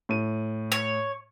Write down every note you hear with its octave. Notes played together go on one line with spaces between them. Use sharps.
A2 D#7
C#5